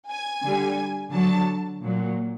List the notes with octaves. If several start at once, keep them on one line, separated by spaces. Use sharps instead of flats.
G#5
D3 G3
D3 F#3 A5
A#2 F#3